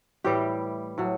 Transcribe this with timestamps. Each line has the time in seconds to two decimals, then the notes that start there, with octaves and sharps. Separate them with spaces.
0.24 A2 E3 G3 G4
0.98 A2 F#3